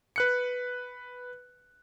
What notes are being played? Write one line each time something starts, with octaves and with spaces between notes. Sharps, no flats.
B4 F#6 C#7